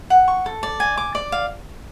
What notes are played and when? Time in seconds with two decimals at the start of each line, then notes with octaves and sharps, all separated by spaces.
0.10 F#5
0.28 C#6
0.46 A4
0.63 D5
0.80 G#5
0.97 D6
1.15 D5
1.32 F5